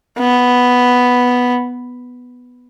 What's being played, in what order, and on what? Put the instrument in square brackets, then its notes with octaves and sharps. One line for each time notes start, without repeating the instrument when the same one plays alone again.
[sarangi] B3